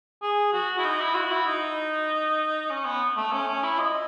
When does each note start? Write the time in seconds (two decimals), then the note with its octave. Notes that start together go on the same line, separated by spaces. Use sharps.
0.22 G#4
0.53 F#4
0.78 E4
0.84 D#4
1.00 E4
1.15 F#4
1.31 E4
1.47 D#4
2.70 C#4
2.85 B3
3.16 A3
3.33 C#4
3.48 C#4
3.63 E4
3.79 D#5